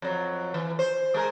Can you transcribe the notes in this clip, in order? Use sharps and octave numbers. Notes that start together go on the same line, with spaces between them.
F2 F#3
E3
C5
G#3 G#4 A#4